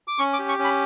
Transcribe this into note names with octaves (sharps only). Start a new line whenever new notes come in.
D6
C#4 C#6
D6
G4
C#6
C#4
B5